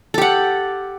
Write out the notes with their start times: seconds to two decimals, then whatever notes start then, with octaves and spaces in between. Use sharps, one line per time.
0.14 A4
0.18 G4
0.22 F#5